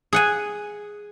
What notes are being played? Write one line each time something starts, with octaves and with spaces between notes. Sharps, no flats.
G#4 F#5 G#5